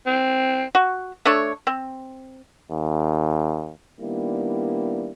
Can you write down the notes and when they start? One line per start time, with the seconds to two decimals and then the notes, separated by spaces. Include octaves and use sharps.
0.06 C4
0.75 F#4
1.25 A3 D4 A4 C#5
1.67 C4
2.71 D#2
4.00 D#3 G3 A#3 B3 D4 E4